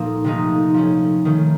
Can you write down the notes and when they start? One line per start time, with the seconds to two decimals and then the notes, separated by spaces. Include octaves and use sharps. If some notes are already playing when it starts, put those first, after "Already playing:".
Already playing: A#2 F3 A#3 D#4 A4
0.24 C3 F3 A3 D#4
0.74 F3 A3 C#4
1.25 D#3 A3 C#4